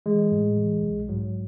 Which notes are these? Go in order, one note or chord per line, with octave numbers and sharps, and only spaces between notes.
E3 G#3
A2
E3
B1
G#2 F#3